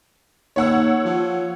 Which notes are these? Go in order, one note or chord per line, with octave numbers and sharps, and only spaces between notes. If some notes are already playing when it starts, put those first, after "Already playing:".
D#2 C#5 F#5 E6
F3